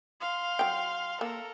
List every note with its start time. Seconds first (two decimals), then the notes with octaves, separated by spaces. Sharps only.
0.21 F5 C6
0.59 F#3 G5
1.21 A#3 A4 A#4